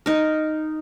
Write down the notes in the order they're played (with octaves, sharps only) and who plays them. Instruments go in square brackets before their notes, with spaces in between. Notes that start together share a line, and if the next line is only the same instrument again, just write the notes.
[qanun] D#4 A#4